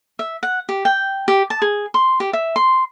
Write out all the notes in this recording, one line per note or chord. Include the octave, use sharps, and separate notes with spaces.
E5
F#5
G4
G5
G4
A5
G#4
C6
G4
E5
C6